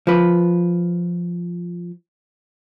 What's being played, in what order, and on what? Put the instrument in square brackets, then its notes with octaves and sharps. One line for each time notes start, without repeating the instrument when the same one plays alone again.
[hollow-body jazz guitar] F3 B4